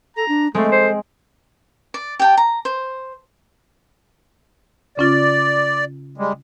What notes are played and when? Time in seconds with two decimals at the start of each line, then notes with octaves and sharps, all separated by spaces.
0.17 A4 A#5
0.28 D4
0.55 G#3 A3 C4 A4
0.72 C5
1.94 D5
2.19 G4 G5 A5
2.37 A#5
2.65 C5
4.97 C#3 C#4 F4 D5
6.18 G3 G#3